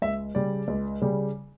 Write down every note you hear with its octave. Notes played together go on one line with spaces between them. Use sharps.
C#2 E5
C#3 G3 D5
C#2
C#3 G3